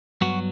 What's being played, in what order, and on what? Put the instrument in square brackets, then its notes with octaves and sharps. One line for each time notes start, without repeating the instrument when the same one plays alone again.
[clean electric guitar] G2 F#3 B3 F#4